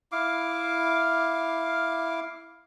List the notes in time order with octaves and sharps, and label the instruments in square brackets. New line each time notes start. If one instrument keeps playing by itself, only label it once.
[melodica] E4 F5 D6